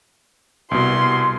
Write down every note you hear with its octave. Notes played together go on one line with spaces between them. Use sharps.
C2 B2 C6